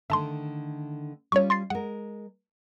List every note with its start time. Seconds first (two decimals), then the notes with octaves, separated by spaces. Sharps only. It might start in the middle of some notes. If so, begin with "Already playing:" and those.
0.10 D3 D#3 A3 E5 A5 C6
1.32 G3 C#4 F4 C#5 C#6
1.50 C6 A6 C7
1.70 G#3 A#4 F#5